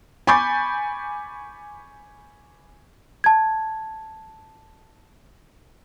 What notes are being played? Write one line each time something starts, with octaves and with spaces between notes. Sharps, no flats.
G#5 B5 C#6 D6 G6 A6
A5 G#6